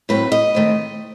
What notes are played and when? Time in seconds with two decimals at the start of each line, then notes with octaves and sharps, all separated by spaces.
0.09 A2 F#3 A3 C4 B4
0.32 D#5
0.55 D#3 A3 C4